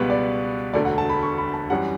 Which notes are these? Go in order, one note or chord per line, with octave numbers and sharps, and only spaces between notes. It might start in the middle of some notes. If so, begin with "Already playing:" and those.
Already playing: C#2 B2 G3 B3 B4
D5
E1 D2 D3 A3 D5
F#5
A5
B5
C#6
B5
A5
F#2 E3 G3 F#5